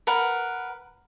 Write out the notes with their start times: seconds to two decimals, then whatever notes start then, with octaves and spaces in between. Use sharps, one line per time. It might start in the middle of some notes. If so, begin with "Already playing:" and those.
0.07 A#4 B4 F#5